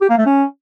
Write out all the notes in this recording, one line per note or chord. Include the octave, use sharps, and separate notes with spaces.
G4
A#3
A3
C#4